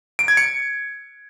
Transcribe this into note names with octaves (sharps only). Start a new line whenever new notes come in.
D7
G#6
C#7